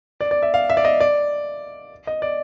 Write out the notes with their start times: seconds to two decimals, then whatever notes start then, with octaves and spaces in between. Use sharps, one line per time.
0.21 D5
0.31 D5
0.42 E5
0.54 F5
0.70 E5
0.77 D5
0.85 D#5
1.00 D5
2.07 D#5
2.22 D5